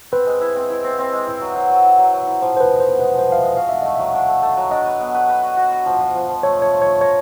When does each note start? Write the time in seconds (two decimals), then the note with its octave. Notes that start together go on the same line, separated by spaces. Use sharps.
0.12 C4 B4
0.26 G#3
0.41 E4
0.56 C4
0.70 E4
0.84 C4
0.98 C4
1.13 G#3
1.27 E4
1.41 F#3
1.56 F#3
1.70 F#3
1.84 E4
1.99 F#3
2.13 F#3
2.27 E4
2.42 F3 C5
2.56 F3 C5
2.60 B4
2.70 G#3
2.80 B3 C5
2.99 G#3 B4
3.14 F3
3.19 C5
3.28 F3 F5
3.38 G#3 E5
3.57 F#4 F5
3.69 D4 E5
3.82 A3 D#5
3.96 F#3 E5
4.14 D4
4.28 A3
4.42 A3
4.57 F#3
4.71 D4 D#5
4.86 B4
5.00 B3
5.14 B4
5.29 B4
5.43 F#4
5.57 F#4
5.71 F#4
5.86 F3
6.01 F3
6.15 F3
6.29 F3
6.43 A3 C#5
6.58 A3 C#5
6.72 F3
6.82 A3 C#5
7.00 A#4 C#5